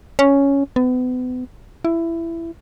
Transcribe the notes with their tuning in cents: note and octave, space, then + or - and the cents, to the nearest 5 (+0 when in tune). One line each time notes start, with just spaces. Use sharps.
C#4 +5
B3 +35
E4 +15